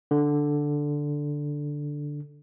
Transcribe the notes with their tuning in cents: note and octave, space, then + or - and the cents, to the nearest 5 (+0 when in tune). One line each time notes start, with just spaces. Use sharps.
D3 +0